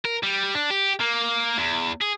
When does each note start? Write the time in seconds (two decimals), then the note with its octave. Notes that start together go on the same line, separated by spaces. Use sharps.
0.05 A#4
0.23 G3
0.55 D4
0.70 G4
1.00 A#3
1.58 E2
2.02 G#4